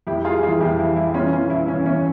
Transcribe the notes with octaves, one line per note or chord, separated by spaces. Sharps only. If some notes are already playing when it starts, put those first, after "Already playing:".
F2 E4 G4
G3 F4 G#4
E3 F4 G#4
F2 E4 G4
E3 E4
G3 E4
E3 C#4 F4
E3 C#4 F4
G2 E4
E3 C#4
E3 C#4